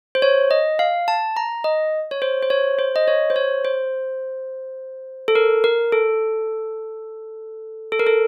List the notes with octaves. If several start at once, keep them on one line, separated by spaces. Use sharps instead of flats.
C5
C#5
D#5
F5
A5
A#5
D#5
C#5
C5
C5
C#5
C5
D#5
C#5
C5
C#5
C5
A4
A#4
A#4
A4
A4
A#4
A4